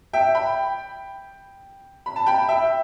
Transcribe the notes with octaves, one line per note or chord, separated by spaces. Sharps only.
E5 G5
G5 B5
B5
A5
G5 B5
E5 G5